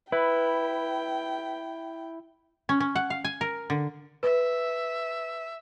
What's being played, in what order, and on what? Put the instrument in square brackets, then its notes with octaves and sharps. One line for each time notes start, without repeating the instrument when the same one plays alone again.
[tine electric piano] E4 [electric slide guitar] B4 [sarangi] G5
[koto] C#4
C#4
F#5
F5
G#5
A#4
D3
[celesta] B4 [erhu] E5